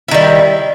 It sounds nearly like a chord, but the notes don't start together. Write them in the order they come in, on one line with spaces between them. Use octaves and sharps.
E4 D#3 G3